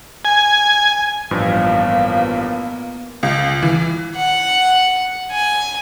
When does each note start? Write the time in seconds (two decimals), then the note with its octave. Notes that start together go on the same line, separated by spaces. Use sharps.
0.25 G#5
1.31 A1 G2 F3 A#3 B3 F5
3.23 C#2
3.62 E3
4.16 F#5
5.32 G#5